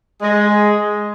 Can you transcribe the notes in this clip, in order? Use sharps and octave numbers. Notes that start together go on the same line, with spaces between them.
G#3